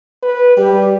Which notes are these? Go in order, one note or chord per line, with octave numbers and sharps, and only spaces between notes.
B4
G3 G4